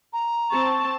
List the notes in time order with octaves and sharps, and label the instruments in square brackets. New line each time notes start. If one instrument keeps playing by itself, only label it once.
[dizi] A#5
[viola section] C4 A5 [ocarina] C#6